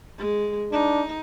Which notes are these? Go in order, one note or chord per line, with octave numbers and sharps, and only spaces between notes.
G#3
D4 D#4